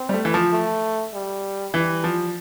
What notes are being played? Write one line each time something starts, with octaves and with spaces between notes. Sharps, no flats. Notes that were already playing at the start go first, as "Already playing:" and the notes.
Already playing: C4
G3
A3
E3
F3
A3
G3
E3 G3
F3